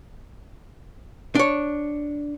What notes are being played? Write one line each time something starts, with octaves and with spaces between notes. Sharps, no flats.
D4 C#5